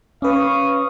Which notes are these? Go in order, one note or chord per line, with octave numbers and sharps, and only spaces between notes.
C#4 B4 F5 C#6 D#6